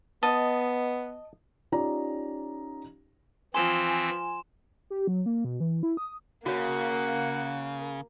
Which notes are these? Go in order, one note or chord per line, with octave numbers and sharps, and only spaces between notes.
B3 D#5 A5
C#4 D#4 F4 G4 D5 A#5
E3 F3 C4 G#5 C6 E7
G4
F#3
A#3
B2
E3
E4
D#6
C#3 A#3 F#4 C#5 F#5